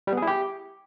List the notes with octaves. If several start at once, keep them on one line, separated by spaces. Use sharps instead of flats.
G3
B3
G#4
E4
G4